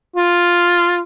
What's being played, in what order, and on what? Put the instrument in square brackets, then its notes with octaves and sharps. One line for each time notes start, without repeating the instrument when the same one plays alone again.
[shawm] F4